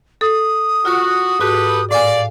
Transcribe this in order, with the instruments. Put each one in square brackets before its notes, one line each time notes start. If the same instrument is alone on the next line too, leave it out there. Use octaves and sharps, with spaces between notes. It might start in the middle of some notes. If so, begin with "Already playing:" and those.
[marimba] A4 [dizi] D#6
[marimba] F4 [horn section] F#4
[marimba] G#2 F#4 [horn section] G4 A4 B4
[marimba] A2 G#5 [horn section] D5 [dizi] F5